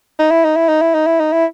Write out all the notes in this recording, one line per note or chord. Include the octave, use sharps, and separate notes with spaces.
D#4
E4
D#4
E4
D#4
E4
D#4
E4
D#4
E4